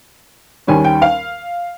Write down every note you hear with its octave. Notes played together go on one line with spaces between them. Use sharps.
D#2 D#3 G3 C#4 G#5
G5
F5